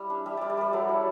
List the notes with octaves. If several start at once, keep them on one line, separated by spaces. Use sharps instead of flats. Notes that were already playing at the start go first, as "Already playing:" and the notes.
Already playing: G3 E4
D4
G3 E5
G3 D5
D5
G3 B4
F#3 A4
E4